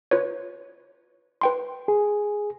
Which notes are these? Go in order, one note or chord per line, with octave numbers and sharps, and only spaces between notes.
F4 B4 C#5
B4 G5 C6
G#4